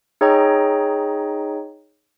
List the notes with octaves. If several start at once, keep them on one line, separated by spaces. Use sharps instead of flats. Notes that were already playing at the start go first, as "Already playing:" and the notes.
D#4 G#4 C#5 D#5 G5 A#5